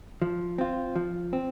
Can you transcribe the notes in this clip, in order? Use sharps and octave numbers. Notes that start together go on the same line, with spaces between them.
F3
C4 F4
F3
C4